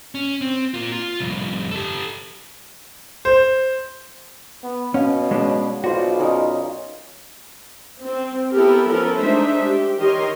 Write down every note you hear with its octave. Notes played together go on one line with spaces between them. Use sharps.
C#4
C4
A#3 F4
F4
C2 F2
G4 A4
C5
B3
B2 C#4 C#5 F5 F#5
G#3 C#4 D4
B1 F4 F#4 C5 D5
C#4 D#4 A#4
C4
B3 E4 G4 A4 A#4
F3 B3 C#4 A4 A#4
G#3 A3 D4 D#4 C5 E5
G4
D#3 G4 A#4 C#5 D#5 C6